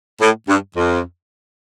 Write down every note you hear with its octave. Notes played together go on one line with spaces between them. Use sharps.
A2
G2
F2